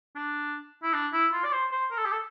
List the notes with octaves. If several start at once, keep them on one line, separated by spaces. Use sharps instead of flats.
D4
E4
D4
E4
F4
D5
C5
C5
A#4
A4
G4
A4